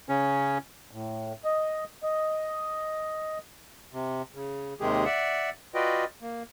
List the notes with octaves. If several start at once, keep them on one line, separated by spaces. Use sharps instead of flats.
C#3 C#4
A2
D#5
D#5
C3
C#3
D#2 C3 D#3 G#3 G4 G#4
D5 E5 F#5
F4 F#4 B4 D5 D#5 G5
A#3